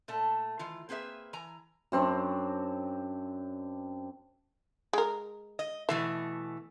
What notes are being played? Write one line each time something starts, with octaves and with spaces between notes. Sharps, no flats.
A#2 A3 A4 A5
D#3 E3 F4
A#3 C4 G#4 B4 E5
E3 G#5 A#5
F#2 C4 D4 C#5
G#3 A#4
D#5
B2 E3 A3 E5